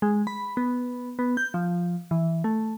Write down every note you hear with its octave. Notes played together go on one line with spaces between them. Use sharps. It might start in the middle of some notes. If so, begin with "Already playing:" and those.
G#3
B5
B3
B3
G6
F3
E3
A3